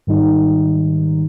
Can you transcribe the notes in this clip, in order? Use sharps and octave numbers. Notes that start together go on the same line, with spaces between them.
G#2 D#3 G3 D#4